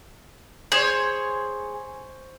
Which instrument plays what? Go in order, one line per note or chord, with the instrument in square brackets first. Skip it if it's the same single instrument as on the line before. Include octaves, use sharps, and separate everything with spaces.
[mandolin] G#4 [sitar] C5 C#5